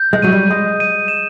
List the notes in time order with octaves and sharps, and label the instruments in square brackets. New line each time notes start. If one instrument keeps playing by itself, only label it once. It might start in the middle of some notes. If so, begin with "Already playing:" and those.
Already playing: [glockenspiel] G6
[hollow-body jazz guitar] G#3
[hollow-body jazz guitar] F#3 [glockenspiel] D#7
[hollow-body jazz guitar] G3
[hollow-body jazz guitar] G#3 [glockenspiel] D#6
[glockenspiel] D#7
E7